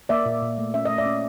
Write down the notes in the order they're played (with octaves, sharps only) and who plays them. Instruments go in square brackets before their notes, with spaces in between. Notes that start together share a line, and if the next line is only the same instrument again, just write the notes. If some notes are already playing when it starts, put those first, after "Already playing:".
[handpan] A#3 D5 E5
A#2
A#2
A3
C#4 E5
A3 D#5
D5 E5
C#4